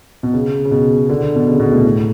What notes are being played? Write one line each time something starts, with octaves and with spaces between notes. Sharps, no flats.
B2
C#3
C#3
B2
D3
B2
C#3
B2
A2
A2